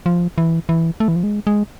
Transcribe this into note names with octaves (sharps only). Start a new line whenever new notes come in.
F3
E3
E3
A3
E3
F3
G#3
G#3